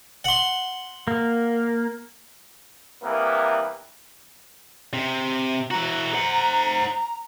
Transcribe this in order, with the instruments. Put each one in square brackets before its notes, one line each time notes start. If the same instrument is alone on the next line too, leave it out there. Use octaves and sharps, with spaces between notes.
[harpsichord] F#5 C6
[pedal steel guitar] A#3
[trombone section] C3 E3 G3 A#3 B3
[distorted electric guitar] C3
[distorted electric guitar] E3 F#4 [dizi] A#5
[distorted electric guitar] C5 F#5